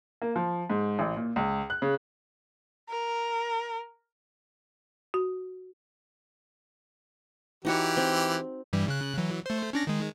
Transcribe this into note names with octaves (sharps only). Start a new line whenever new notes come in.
A#3
F3
G#2
A1
A#2
C#2
F#6
C#3
A#4
F#4
E3 D#4 F#4 G4 C#5
C4
G2 E3 G3
C#3 F#6
E3 F#3
A3 C5
C#4 D4 A#6
D#3 G#3